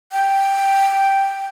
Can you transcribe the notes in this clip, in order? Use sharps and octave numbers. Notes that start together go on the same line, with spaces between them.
G5